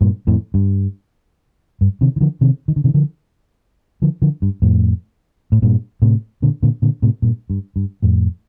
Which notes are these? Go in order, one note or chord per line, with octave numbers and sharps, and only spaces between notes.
G2 A#2
F2 A2
G2
G2
C3 D#3
D#3
D3 F3
C3 D#3
D#3
D3
C3 D#3
D3 F3
D3 F3
D3 F3
G2
F2 A2
A2
G2 A#2
A2 C3
A#2 D3
A#2 D3
A#2 D3
A2 C3
G2 A#2
G2
G2
F2 A2